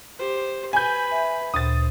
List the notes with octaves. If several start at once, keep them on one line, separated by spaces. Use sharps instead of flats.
G4 C5
B4 G#5 B5 G6
E5
D2 A#2 C5 D#6 A6